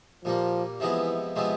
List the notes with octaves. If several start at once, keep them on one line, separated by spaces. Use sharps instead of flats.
A#2 F3 G3 A#3
C3 E3 F3 G#3 B3 E4
C3 F3 G#3 B3 E4